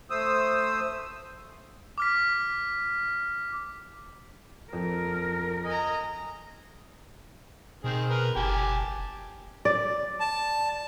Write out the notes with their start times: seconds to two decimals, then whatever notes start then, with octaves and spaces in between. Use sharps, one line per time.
0.10 A3 C5 D#6 E6
1.98 D6 F6 B6
4.73 F2 A#4
5.65 D#5 G#5 A#5
7.84 B2 D#3 C4 G#4
8.10 A#4 B4
8.36 F#1 G4 G#5 A5
9.65 D5
10.20 A5